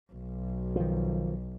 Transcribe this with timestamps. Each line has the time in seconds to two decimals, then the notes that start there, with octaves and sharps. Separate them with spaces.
0.13 B1
0.76 D#3 F3